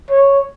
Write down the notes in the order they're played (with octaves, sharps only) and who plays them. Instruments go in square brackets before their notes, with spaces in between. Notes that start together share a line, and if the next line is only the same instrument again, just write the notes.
[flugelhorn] C#5